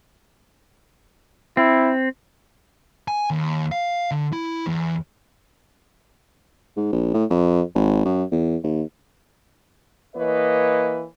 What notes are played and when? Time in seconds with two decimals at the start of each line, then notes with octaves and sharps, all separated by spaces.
1.57 C4 E4
3.08 G#5
3.31 D#2
3.72 F5
4.11 D3
4.33 E4
4.66 E2
6.77 G#2
6.93 A#1
7.14 A2
7.30 F2
7.75 G#1
8.06 F#2
8.32 E2
8.64 D#2
10.15 E3 A#3 B4 C#5 D#5